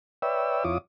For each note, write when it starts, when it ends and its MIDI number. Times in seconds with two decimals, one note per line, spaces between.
0.22 0.64 71
0.22 0.64 73
0.22 0.64 74
0.22 0.64 76
0.22 0.64 79
0.22 0.64 88
0.64 0.78 41
0.64 0.78 64
0.64 0.78 65
0.64 0.78 73
0.64 0.78 86
0.64 0.78 87